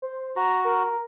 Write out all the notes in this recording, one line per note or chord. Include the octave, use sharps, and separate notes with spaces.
C5
F#4 A#5
A#4